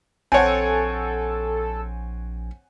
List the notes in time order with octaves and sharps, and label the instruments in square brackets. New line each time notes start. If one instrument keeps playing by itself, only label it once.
[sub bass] A#1 [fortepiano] C4 C#5 [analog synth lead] A4 [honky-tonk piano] F#5 G#5